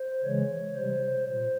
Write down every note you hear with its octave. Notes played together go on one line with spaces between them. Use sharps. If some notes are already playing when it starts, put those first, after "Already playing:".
Already playing: C5
C#3 E3 G#3 C#5
C3 G3 C5
A#2 C5